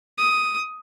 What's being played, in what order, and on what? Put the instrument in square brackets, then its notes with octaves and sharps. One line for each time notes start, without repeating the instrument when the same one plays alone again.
[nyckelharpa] D#6